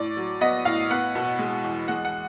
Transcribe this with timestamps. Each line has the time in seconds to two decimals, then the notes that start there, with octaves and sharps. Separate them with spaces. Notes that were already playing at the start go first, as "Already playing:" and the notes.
Already playing: A2 D5
0.17 F#3
0.41 B3 D#5
0.65 A2 F5
0.90 B3 F#5
1.15 B2
1.39 G#3
1.64 E2
1.88 G#3 F#5
2.05 F#5